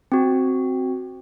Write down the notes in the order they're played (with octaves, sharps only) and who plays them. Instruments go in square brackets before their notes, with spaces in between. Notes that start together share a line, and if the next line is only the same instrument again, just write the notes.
[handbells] C4 F#4